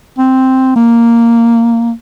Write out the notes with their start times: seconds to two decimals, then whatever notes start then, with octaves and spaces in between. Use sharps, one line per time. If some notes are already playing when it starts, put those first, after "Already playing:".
0.19 C4
0.76 A#3